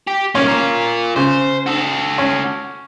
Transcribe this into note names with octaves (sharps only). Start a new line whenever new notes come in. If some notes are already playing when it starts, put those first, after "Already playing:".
G4
B1 A#3 C#4
F4 A#4
C#3 C5
F#4 A4
C#4